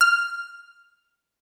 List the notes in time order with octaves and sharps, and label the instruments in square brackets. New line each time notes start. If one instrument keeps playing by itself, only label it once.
[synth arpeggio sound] F6